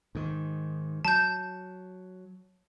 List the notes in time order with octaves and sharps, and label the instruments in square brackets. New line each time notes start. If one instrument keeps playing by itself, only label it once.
[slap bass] G#2 D#3
[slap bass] F#3 [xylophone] A5 G6